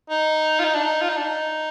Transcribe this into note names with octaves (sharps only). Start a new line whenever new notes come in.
D#4
F4
D#4
D4
D#4
F4
D#4
D4
D#4